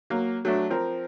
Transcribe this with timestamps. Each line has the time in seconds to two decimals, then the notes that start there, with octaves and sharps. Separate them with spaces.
0.10 F#3 A#3
0.45 F#3 A3 D4
0.70 F3 C4 A#4